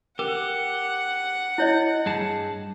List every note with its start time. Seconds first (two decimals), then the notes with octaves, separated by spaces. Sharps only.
0.19 G4 A#4 F#5
1.58 E4 C#5 D#5
2.06 G2 G#4 A5